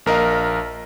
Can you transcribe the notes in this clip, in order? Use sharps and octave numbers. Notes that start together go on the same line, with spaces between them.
A#1 A#4 D#5 F5